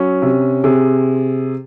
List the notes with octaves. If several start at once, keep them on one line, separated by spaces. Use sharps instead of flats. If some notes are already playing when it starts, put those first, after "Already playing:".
Already playing: F#3 C#4
C3
C3 G#4